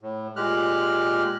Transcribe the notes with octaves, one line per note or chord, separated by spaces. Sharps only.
A2
A#2 G#3 G4 F6 F#6